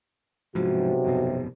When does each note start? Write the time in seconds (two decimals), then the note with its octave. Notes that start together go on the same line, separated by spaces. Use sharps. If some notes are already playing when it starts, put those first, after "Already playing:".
0.55 B1 G#2 C3 F3 F#4
1.05 G1 F2 B2